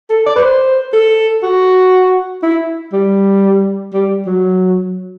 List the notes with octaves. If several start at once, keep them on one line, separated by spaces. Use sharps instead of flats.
A4
D5
B4
C5
A4
F#4
E4
G3
G3
F#3